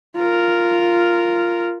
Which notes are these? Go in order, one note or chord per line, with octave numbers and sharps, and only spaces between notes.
F4 A#4